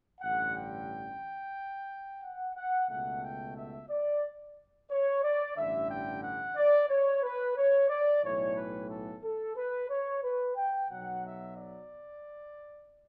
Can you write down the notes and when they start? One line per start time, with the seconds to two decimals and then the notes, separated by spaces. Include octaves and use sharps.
0.21 A1 G2 D3 F#5
0.55 G5
2.22 F#5
2.56 F#5
2.88 C#2 B2 A3 F#5
3.23 G5
3.55 E5
3.89 D5
4.89 C#5
5.23 D5
5.56 A1 G2 D3 E5
5.89 G5
6.22 F#5
6.57 D5
6.89 C#5
7.23 B4
7.57 C#5
7.89 D5
8.22 B1 A2 E3 A3 C#5
8.56 B4
8.89 A4
9.22 A4
9.56 B4
9.89 C#5
10.23 B4
10.56 G5
10.89 B1 B2 F#3 F#5
11.24 E5
11.56 D5